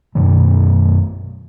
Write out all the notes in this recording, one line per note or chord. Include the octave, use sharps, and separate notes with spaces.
F#2 B2 D#3 A3